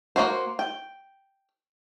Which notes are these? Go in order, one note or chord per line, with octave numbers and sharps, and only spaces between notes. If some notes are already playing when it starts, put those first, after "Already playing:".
A#3 C4 F#4 C5
G5